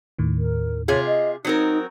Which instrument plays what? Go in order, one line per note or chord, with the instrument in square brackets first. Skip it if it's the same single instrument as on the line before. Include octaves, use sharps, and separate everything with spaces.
[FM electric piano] D#2 A2 D#3
[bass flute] A#4
[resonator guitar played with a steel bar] C3 F4 G#4 [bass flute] C#5
[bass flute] D#5
[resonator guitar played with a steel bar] F#3 C4 A#4 [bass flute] D#4 [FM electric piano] D#6